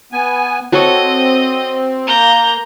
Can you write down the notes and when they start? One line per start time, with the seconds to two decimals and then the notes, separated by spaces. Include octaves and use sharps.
0.12 B3 G#5
0.72 C4 F#4 A4 C#5 D#5
2.07 A#3 A#5 G6